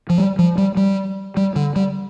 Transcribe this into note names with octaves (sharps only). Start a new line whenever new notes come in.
F3
G3
F3
G3
G3
G3
D3
G3